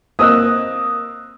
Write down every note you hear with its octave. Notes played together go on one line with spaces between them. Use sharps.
A#3 C4 D#5 D#6 E6 F#6